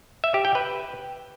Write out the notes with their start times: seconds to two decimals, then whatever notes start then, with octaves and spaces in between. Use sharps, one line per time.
0.24 E5
0.34 G4
0.45 G5
0.55 B4